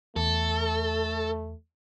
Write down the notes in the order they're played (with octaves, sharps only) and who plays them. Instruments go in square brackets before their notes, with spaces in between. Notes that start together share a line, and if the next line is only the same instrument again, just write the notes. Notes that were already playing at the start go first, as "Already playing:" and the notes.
[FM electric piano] E2 [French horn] A3 [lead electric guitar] A4